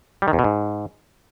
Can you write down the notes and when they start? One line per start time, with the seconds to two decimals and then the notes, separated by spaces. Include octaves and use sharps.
0.22 G3
0.28 D#3
0.33 E2
0.39 B2
0.44 G#2